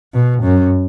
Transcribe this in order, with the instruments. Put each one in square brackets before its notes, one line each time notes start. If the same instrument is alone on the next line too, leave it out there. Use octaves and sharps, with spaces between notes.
[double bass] B2
F#2